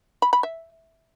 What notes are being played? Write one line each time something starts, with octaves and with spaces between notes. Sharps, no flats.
B5
B5
E5